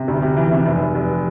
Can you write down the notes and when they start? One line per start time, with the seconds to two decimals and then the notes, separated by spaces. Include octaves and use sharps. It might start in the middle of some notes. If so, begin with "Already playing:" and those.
Already playing: C3
0.08 D2
0.22 C3
0.37 E3
0.51 C3
0.66 F1
0.81 F1
0.95 F1